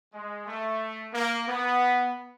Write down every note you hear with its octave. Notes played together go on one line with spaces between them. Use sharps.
G#3
A3
A#3
B3